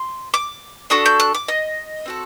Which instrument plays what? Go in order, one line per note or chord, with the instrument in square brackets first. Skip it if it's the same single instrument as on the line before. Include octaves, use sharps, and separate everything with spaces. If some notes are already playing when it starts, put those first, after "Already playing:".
Already playing: [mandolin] C6
D6
D4 F#4 A4 D#6
G6
F#6
D6
D#5
C4 F#4 A4